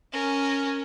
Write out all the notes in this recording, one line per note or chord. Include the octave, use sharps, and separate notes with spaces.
C#4 A#4